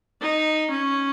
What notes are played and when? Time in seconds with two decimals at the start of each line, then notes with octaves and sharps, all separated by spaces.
0.21 D#4
0.70 C#4